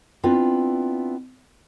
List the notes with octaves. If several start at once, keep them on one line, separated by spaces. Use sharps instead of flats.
B3 C4 D4 E4 F4 B4